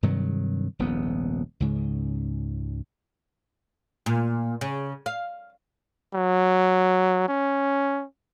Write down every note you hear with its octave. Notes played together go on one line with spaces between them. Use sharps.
G2 C3 D#3 F#3
D#1 A#1 G#2 B3
C#2 G#2 C#3
A#2
C#3
F5
F#3
C#4